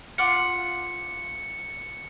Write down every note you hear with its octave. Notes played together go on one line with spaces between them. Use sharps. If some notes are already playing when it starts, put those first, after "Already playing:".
F4 F#5 D6 C#7